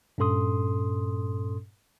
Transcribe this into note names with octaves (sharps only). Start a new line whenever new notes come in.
G2 A#2 C#4 A4 C6 D#6